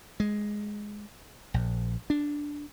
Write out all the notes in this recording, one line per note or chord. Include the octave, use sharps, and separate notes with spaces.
G#3
A#1
D4